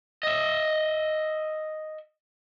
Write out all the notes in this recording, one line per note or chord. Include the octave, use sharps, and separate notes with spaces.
D#5 E5